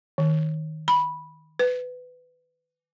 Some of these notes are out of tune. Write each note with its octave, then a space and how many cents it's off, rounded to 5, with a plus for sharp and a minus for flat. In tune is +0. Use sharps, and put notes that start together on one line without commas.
D#3 +10
B5 -10
B4 +20